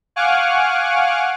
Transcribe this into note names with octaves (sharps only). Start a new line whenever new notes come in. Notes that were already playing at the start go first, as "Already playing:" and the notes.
F5 F#5 G#5 C#6 D6 F6